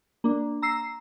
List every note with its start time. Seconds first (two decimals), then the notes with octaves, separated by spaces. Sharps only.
0.24 A#3 D4
0.62 A#5 E6 C7